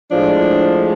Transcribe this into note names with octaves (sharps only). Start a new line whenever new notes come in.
A2 F3 G#3 D4